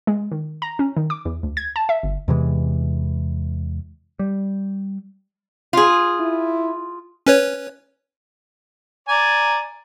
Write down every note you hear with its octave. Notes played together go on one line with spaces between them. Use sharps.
G#3
D#3
A#5
C#4
D#3
D6
E2
D2
G#6
A5
E5
G1
E2 C3 E3 G#3
G3
F4 G#4
E4
C#4 B4 C#5
D5 G#5 A#5